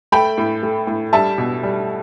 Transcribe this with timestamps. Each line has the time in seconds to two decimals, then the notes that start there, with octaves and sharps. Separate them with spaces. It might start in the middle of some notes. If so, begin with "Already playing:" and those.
0.12 A3 G5 B5
0.38 A2
0.63 A3
0.87 A2
1.13 G3 E5 A5
1.38 B2
1.63 G3